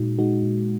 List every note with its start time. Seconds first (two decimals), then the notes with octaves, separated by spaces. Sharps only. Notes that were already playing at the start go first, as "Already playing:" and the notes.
Already playing: A#2 G#3 D#4 F#4
0.19 G#3 D#4 F#4
0.43 A#2